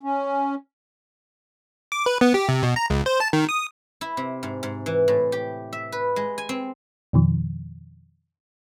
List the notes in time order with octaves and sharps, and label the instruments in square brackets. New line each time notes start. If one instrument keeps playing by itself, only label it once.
[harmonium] C#4
[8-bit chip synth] D6
B4
B3
G4
C3
B2
A#5
C#2
C5
A5
D#3
D#6
[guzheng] E4
C3
G#2
G#2
E3
A2
G4
E5
B4
G#3
G#5
C4
[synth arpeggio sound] F2 B2 D#3 F3